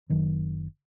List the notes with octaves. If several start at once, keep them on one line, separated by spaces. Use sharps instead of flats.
F#1 D#3 F#3